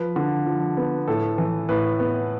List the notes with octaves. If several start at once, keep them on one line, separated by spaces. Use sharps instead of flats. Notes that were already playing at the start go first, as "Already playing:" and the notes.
Already playing: F3 B4
D3
F3
B3
A2 A4
E3
A2 B4
B3